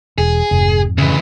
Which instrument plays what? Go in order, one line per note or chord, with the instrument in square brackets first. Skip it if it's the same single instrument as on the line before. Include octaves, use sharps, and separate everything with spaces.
[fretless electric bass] E1 [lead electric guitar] G#4
[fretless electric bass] F1 [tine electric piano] F2 G#2
[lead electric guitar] D2 E3 [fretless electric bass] C#3